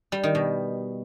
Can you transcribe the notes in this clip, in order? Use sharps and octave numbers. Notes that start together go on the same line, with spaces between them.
G3
D#3
B2